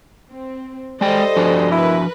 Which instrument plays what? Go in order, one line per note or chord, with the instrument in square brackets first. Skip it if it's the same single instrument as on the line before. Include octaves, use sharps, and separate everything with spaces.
[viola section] C4
[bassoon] G3 [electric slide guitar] G#3 G5 [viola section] A4 C5 D#5
[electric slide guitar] F3 D4 F#4
[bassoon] E4 [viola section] A#4 B4